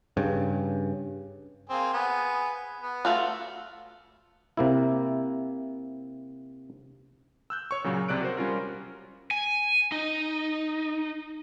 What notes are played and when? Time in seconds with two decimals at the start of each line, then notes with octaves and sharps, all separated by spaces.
0.17 G2 C#3
1.70 A#3 C4 G#4
1.93 B3 G#4
2.81 B3
3.05 A3 F4 F#4
4.57 C3 A#3 E4
7.50 E6 F#6 G6
7.71 C#5 C#6
7.84 A#2 C#3 F#3
8.09 C2 C3 D5 F#6 D7
8.21 F#4 A#4 C5
8.37 G3 C#4 F4 A#4
9.31 G#5
9.92 D#4